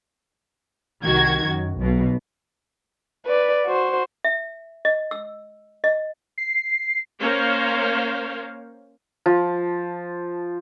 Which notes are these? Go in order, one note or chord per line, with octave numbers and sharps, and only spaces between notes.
C2 D#3 F#4 G#6
F#2
B1 B2
B4 D5
F#4 C5
E5
D#5
E6
D#5
C7
A#3 C#4 A#4 C5 C#5 F5
F3